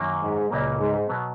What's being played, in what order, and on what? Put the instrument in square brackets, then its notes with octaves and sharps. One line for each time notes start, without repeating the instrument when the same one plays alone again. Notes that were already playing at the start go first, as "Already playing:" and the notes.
Already playing: [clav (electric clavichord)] F#2 D#3 F#3 A#3
[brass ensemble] G#2
[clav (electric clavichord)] C#2 C#3 F#3 A#3 [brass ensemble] A#2
[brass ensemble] G#2
[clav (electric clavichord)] B2 F#3 B3